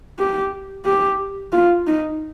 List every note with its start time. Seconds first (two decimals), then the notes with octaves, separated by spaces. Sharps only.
0.19 G4
0.86 G4
1.52 F4
1.87 D#4